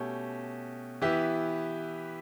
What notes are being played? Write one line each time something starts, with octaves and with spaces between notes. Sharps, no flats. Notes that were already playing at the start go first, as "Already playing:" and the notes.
Already playing: B2 A3 C#4 G4
E3 B3 E4 G4